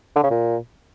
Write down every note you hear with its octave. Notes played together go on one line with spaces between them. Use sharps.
D3
C#3
A#2